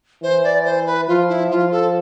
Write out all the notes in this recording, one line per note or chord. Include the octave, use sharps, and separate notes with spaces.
E3 C5
D5
C5
B4
F3 F4
E4
F3 F4
A4